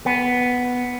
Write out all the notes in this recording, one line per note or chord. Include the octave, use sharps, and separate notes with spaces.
B3